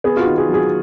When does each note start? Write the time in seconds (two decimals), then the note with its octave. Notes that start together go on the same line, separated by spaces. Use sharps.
0.04 B3 G#4
0.17 F4
0.21 F#4
0.27 D#3
0.38 G#4
0.49 F#3 G#4